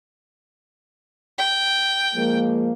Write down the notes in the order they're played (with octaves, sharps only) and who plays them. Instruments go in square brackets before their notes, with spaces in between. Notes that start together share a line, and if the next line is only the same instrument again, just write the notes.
[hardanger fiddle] G5
[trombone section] F3 G#3 A#3